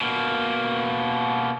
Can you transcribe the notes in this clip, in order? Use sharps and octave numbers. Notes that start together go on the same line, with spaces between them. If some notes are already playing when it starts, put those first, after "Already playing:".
B2 A#3